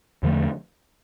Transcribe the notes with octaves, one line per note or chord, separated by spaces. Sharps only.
E2 D3 F3 A3